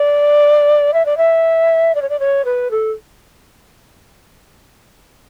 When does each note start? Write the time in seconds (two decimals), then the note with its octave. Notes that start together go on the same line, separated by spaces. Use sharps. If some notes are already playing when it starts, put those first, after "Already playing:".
Already playing: D5
0.94 E5
1.05 D5
1.17 E5
1.95 D5
2.02 C#5
2.09 D5
2.20 C#5
2.45 B4
2.71 A4